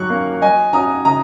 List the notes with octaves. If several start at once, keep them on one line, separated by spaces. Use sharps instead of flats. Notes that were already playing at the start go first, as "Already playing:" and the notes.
Already playing: F#3 C#6 F#6
A#3 C#4
F#3 D#5 G#5
C#4 F#4 C#5 A#5 D#6
C#3 A#5 D#6